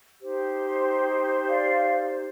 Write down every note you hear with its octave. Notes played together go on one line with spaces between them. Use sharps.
D#4 G4 C5
D5 F5